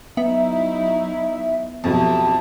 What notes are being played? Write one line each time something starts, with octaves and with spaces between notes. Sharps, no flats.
F#3 B3 D#4 E4 E5
F2 B2 F#3 C4 E4 G4 A5